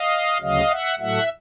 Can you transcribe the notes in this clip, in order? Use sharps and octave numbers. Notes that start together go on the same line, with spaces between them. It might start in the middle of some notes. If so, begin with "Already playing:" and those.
Already playing: D#5 F5
D2 C#3 F#3 D#5 F5
E5 F#5
A2 F#3 A3 E5 F#5